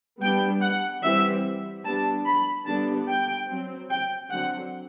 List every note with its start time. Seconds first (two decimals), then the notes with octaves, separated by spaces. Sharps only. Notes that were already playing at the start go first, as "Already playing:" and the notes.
0.21 G3 B3 D4 G5
0.61 F#5
1.03 E3 G3 C4 E5
1.84 G3 B3 D4 A5
2.26 B5
2.66 D3 G3 B3 D4 A5
3.09 G5
3.49 F#3 C4
3.90 G5
4.31 D3 F#3 C4 F#5